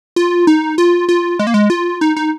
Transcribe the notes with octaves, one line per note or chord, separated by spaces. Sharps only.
F4
D#4
F4
F4
G#3
A#3
G#3
F4
D#4
D#4